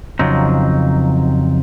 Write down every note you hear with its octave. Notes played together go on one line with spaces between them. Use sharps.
F2 C#3 F#3 C4 D#4